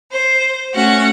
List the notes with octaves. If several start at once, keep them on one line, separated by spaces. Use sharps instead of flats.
C5
A3 C#4 F#4 F#5